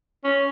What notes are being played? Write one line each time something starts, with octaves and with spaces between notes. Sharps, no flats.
C#4